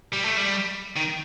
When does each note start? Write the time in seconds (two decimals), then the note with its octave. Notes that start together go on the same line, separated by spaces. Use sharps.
0.12 G3
0.25 A3
0.37 G3
0.97 D#3